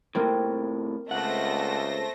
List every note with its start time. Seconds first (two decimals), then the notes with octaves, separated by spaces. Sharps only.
0.15 A2 C3 A#3 C4
1.11 C#2 A3 C5 F#5 A#6